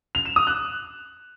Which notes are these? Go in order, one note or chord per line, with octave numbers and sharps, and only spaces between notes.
F7
E7
D#6
F#6